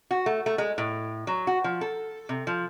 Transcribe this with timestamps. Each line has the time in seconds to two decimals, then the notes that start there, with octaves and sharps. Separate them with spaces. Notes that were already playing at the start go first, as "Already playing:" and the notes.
0.11 F#4
0.26 A3
0.46 A3
0.58 G#3
0.78 A2
1.27 F#3
1.47 F#4
1.64 F3
1.81 A4
2.29 C3
2.47 F3